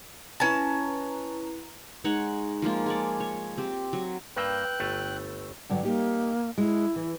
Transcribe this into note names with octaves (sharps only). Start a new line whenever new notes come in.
C#4 E4 B4 A5 A#5
G#3 D#4 C#5 F#5
F3 G#3 A#3 F4
G#4 C#5 D5
C#5
C4 G4
F#3
G2 A#3 B4 G5 E6 F#6 G6
G1 A3
G2 D3 F#3
A#3 D#4 G4
G#3 E4
E3